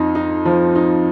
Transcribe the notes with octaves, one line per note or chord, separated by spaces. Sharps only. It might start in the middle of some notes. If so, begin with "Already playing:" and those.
Already playing: F2 D#4
D#4
F3
D#4